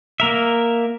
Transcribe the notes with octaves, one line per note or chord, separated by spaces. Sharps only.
A#3 A#4 E5